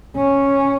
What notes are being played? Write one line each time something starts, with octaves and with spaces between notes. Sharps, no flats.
C#4